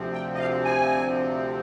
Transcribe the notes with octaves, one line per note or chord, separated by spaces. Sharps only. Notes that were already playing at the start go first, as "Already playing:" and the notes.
Already playing: D2 C3 F3 C4
G5
D#5
F5
G#5